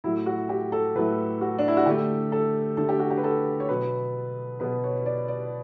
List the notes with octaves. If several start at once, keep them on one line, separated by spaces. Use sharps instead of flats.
A2 F#3 A3 E4
F#4
G4
A4
A2 F#3 A3 B4
F#4
D4
E4
F#4
D3 A3 G4
A4
D3 A3 A4
G4
F#4
G4
B4
A4
C#5
B2 F#3 B3 B4
B2 F#3 B3 B4
C#5
D5
D5